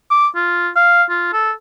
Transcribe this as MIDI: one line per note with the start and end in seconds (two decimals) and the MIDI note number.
0.11 0.27 86
0.35 0.68 65
0.76 1.03 77
1.10 1.28 65
1.33 1.51 69